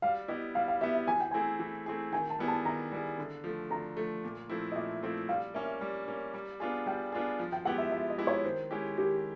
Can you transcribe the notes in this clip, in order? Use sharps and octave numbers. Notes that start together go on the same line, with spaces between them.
G3 F5
B3 E4 G4 D#5
G3 F5
F5
B3 E4 G4 E5
E5
E3 G#5
G5
A3 C4 E4 G#4 G#5
E3
A3 C4 E4 G#4
D#3 G#5
A5
G3 B3 E4 G#4
A5
D#3 A#5
G3 B3 E4 G#4
D3
F3 A3
D3 A#5
F3 A3
A#2
F3 A3 C4 E4
D#5
A#2 E5
F3 A3 C4 E4
G3 F5
A#3 C#4 E5
G3
A#3 C#4
G3
B3 D4 F4 G#4
G3 G5
B3 D4 F4 G#4
F3
G5
G#3 B3 E4 G4 F#5
E5
F3 E5
D#5
G#3 B3 E4 G4
C#5
D#3 C5
G#3 C#4 E4 G4
D#3 G4